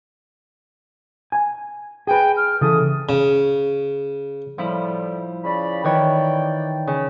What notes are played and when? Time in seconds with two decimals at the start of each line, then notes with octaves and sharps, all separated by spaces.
1.32 G#5
2.07 G#4 B4 G5
2.37 F6
2.61 C#3 E3 A4 D#6
3.09 C#3
4.58 A2 F3 G3 E4
5.44 C#3 D5 B5
5.84 D#3 E3 C#5 D5 G5
6.87 C#3